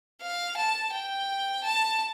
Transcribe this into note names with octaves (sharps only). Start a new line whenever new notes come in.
F5
A5
G5
A5